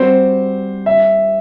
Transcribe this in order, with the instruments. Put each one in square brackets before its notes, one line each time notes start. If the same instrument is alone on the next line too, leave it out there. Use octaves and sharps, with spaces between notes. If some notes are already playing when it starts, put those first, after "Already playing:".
Already playing: [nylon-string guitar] G3 C4 F#4 [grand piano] C5
[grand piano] E5